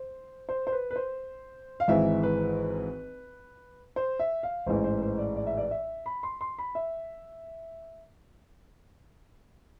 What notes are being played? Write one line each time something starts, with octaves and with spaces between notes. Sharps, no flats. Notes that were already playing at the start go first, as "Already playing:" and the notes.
Already playing: C5
C5
C5
B4
B4
C5
F5
G#1 G#2 E3 E5
B4
C5
E5
F5
A1 G#2 E3 C5
C5
C5
D5
D5
E5
D5
E5
B5
C6
C6
B5
E5